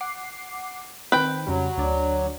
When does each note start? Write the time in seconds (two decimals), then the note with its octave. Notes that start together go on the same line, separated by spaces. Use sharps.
0.01 F#5 D6 C7
1.12 D#3 C4 B4 G5
1.47 F2 C#3 F#3 G3
1.78 D2 D4 D5